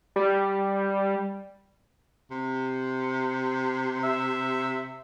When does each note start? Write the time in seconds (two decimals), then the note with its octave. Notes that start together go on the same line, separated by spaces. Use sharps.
0.16 G3
2.31 C3
4.04 E5